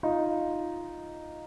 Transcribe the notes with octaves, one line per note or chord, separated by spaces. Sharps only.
D#4 F4